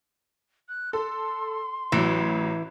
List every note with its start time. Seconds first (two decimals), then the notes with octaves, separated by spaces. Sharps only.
0.69 F#6
0.93 A4 C6
1.92 A1 E3 F#3